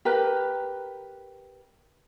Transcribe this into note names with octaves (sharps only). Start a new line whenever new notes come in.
G4 A#4 B4 A#5